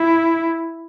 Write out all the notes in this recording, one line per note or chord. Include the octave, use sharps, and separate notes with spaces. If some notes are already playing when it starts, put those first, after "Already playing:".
Already playing: E4